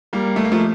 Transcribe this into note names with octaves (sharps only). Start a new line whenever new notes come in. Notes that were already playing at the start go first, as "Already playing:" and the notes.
G3 A#3
A3
A#3
F3 A3